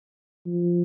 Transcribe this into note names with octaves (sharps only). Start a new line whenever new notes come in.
F3